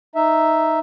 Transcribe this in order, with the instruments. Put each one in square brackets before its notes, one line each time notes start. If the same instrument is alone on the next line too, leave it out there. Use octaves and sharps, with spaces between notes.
[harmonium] D#4 E5